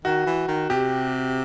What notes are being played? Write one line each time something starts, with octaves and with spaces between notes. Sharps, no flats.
D#3 F#4
E3
D#3
C3 G4